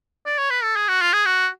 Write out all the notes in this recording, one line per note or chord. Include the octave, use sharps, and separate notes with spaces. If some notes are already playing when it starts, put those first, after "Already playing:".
D5
C#5
B4
A4
G#4
F#4
F4
G#4
F#4